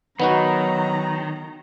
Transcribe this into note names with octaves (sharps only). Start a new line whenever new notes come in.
D#3 F#3 B3 D#4 F#4 A#5